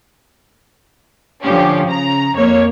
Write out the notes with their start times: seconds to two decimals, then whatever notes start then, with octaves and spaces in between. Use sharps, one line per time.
1.43 D3 F3 C#4 G4
1.87 C#3 A#5
2.36 F2 A#3 C#5